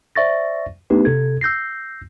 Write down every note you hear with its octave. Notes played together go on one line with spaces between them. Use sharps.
C5 D5 E5 C#6 A6 A#6
A3 B3 D4 D#4 G4 B4
C3 A4 G#6
E6 G6 A#6 C7